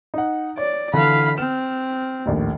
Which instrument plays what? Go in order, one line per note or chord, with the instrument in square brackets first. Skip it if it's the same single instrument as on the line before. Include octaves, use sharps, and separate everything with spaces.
[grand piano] D#4 F#5
[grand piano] C#5 [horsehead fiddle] D5
[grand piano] D3 E3 [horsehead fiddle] F5 B5
[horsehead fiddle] C4 [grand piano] F6 E7
[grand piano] A#1 D#2 A2